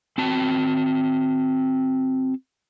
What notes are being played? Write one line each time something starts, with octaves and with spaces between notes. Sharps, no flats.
C4 F#4 A5